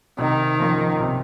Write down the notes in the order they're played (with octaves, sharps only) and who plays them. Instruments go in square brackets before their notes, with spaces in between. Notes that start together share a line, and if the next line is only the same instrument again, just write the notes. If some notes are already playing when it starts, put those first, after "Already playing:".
[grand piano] C3 [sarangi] D#3
[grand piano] F3 A#3 C#4 F4
C3